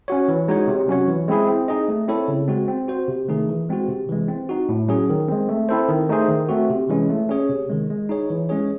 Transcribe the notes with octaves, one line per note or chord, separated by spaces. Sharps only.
C#4 F#4 C#5
E3
G#3 D#4 F#4 C#5
C3
F#3 C#4 F#4 C#5
E3
G#3 C4 E4 G#4
C4
D#4 G#4 D#5
A3
C4 E4 A4 C#5
C#3
G#3 C4 F#4
C4
F#4 C5
C3
D#3 A3 D#4 G#4
E3
G#3 C4 F#4
C3
E3 G#3
C4
D#4 F#4
A2
F#3 C#4 G#4
D#3
G#3 C4
A3
C4 E4 A4 C5
D#3
A3 D#4 G#4 C5
D#3
A3 C4 F#4
C3
E3 G#3 C#4
A3
C#4 G#4 C#5
C3
D#3 G#3
G#3
D#4 G#4 C#5
E3
G#3 C#4 G#4 C#5